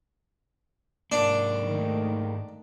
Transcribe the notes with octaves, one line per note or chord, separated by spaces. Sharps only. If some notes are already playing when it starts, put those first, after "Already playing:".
G#2 A#3 D4
D#3 A3